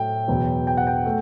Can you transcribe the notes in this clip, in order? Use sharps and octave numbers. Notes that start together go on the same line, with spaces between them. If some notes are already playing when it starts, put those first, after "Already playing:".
Already playing: A2 F#3 A3 G5
E2 B2 F#3
G5
F#5
G5
A3